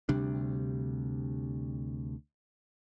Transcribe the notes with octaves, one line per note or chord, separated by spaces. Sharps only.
D2 C3 G3 D4